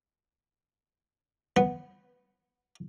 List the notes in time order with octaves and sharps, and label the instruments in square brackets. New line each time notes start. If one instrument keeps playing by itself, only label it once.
[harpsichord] B3